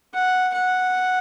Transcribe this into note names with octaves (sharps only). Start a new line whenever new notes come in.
F#5
F#5